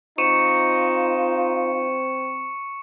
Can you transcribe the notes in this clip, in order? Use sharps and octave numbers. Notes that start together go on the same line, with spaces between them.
C4 D#4 F4 C#6 C#7 E7